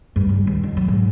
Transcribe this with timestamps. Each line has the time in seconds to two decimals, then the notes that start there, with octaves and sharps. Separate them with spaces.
0.16 G2
0.29 C#2
0.47 D#2
0.63 F2
0.77 F#3
0.88 G#2